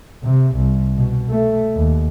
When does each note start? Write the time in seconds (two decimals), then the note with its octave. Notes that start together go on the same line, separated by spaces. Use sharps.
0.23 C3
0.56 C2
0.96 B2
1.30 A3
1.76 D#2